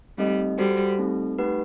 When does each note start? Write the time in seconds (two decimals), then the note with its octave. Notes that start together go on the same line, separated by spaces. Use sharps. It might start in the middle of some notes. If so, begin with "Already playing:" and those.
0.18 G3 A3 C4 D#4 A4 D#5
0.58 G3 F#4 A4 C5 F#5
0.98 A3 C4 D#4 A4
1.39 A3 D#4 G4 B4 F#5